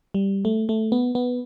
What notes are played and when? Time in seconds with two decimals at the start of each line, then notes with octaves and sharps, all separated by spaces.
0.14 G3
0.45 A3
0.69 A3
0.92 B3
1.15 B3